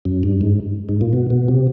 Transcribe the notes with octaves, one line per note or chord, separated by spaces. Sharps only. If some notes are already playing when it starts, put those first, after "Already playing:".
F#2
G2
G#2
G#2
A#2
B2
B2
C3